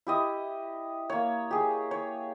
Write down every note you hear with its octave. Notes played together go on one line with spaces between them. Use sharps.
E4 G4 D#5
A#3 C#5
G4 G#4
C#5